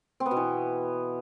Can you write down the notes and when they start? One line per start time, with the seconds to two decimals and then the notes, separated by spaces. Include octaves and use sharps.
0.20 C4
0.26 B3
0.31 B2
0.36 E3